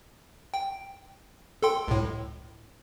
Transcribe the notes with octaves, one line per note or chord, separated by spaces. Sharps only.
G5
A4 G5 C6
C#2 A2